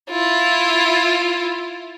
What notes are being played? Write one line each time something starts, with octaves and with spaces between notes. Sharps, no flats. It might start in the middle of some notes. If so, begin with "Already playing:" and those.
E4 F4